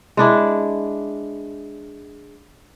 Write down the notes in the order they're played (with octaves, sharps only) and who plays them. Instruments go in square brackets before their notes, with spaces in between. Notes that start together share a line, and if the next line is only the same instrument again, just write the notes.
[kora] G#3 D4 E4